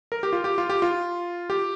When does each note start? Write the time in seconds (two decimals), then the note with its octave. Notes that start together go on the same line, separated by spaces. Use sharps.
0.12 A#4
0.23 G4
0.33 F4
0.44 G4
0.58 F4
0.69 G4
0.82 F4
1.50 G4